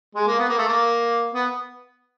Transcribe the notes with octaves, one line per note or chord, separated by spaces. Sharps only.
G#3
A#3
B3
A#3
A3
A#3
B3